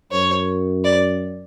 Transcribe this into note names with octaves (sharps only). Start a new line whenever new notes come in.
F#2 C#5
D5